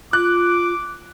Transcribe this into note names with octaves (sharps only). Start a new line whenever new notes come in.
F4 D6 F#6